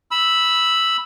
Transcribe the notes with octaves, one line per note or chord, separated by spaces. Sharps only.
B5 E6